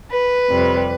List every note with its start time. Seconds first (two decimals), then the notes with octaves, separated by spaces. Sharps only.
0.11 B4
0.50 F2 C3 G3